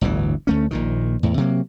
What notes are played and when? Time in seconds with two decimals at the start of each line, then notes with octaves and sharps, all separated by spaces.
0.01 G1 D2 A2 E3
0.47 D2 A3 C#4
0.71 A#1 A#2 D#3
1.23 E2 A2
1.37 C3 F#3 A#3